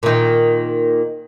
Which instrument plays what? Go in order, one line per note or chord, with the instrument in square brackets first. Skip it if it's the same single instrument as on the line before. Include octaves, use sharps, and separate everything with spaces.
[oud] A#2 D#3